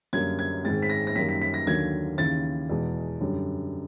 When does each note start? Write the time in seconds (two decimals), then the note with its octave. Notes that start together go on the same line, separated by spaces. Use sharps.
0.13 F#2 D3 G3 A#3 G#6
0.39 G#6
0.64 G#2 D#3 G#3 C4 A6
0.82 B6
0.90 A#6
1.07 A#6
1.16 F#2 D#3 G3 A#3 B6
1.29 B6
1.41 B6
1.54 A#6
1.67 D#2 D3 F#3 A#3 G#6
2.18 D#2 C#3 E3 A6
2.69 E2 B2 G#3
3.21 F#2 D3 G3